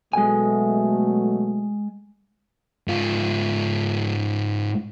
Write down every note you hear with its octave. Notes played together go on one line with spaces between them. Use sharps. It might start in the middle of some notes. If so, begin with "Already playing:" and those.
B2 F#3 G#3 A3 G#5
G#2 F4